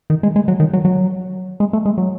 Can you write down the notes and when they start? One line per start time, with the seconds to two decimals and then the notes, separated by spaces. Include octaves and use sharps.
0.10 D#3
0.23 G#3
0.36 G#3
0.48 F#3
0.60 D#3
0.73 F#3
0.85 F#3
1.60 G#3
1.73 A3
1.86 G#3
1.98 F#3